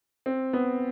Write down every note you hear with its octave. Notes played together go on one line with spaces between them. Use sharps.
C4
B3